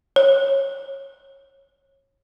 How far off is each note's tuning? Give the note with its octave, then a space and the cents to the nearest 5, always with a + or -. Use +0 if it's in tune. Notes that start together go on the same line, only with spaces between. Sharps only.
C#5 -25